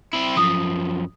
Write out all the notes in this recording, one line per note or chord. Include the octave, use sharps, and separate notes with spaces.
C4 E4
F#2 F3 D#6